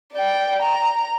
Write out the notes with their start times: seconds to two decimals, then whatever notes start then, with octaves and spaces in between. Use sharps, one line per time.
0.13 D5 G5
0.62 A#5